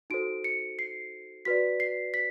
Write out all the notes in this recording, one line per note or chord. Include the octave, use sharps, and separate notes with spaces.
D#4 F#4 A4 C5 D7
C#7
C7
F#4 B4 D5 B6
C7
B6